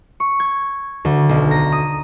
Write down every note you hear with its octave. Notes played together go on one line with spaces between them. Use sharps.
C#6
G#6
D2
B1
A#5
D#6